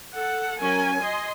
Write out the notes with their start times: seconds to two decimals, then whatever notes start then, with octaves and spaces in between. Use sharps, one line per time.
0.15 A4 F#5
0.60 F#3 C#4 A#4 G#5
1.01 D#5 C6